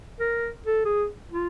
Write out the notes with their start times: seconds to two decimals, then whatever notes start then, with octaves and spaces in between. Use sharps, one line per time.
0.20 A#4
0.67 A4
0.85 G#4
1.32 F4